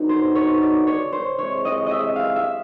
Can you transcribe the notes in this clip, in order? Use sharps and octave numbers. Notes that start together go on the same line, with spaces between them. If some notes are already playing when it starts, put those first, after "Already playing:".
Already playing: D3 F#3 B3 D#4
C5
C#5
D5
C#5
C5
C3 E3 G#3 C#5
D#5
D#5 E5
F5
E5